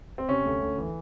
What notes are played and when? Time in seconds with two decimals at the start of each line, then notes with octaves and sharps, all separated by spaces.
0.18 C4
0.29 C3 C#4
0.45 D2
0.62 D2
0.78 E3